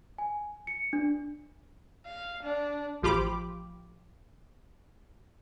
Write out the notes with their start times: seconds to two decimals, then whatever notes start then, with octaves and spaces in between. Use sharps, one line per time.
0.18 G#5
0.67 C#7
0.93 D4
2.06 F5
2.43 D4
3.02 A1 F3 F4 G4 B5 D6